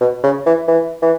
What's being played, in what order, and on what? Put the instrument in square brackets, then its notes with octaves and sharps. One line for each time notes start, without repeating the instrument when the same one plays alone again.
[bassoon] B2
C#3
E3
E3
E3